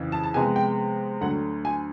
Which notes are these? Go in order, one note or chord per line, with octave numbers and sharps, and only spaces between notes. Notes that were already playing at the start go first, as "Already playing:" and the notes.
Already playing: F2 C#3 E3
A5
A5
C3 F3 G#3 B3 G#5
G5
D2 D3 F#3 A3 F#5
G#5